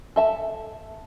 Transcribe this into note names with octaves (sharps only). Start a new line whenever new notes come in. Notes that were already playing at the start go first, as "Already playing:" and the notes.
A4 E5 A5